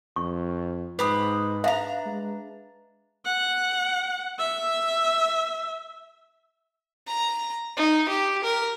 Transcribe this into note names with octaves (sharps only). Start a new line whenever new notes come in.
F2 C#6
G#2 G4 B4 B5 D#6
D4 E5 F5 A#5
G#3
F#5
E5
A#5
D#4
G4
A#4